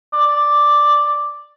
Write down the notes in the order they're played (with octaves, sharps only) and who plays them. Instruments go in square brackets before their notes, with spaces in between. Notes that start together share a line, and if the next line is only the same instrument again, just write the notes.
[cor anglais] D5